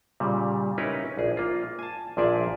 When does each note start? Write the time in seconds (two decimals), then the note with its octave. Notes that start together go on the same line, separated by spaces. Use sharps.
0.20 A#2 C#3 G3
0.78 C#4 D#4 E4 A#4 B4
1.17 A#1 G#4
1.37 A#3 F4
1.79 G#5 A5
2.17 A#1 A#2 F3 G#4 D5 E5